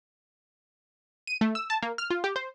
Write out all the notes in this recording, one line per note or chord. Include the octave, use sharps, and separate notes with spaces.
D#7
A3
E6
A5
A#3
F6
F4
G4
C5